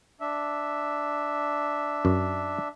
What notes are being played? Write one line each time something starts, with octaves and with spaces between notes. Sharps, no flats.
D4 E5
F#2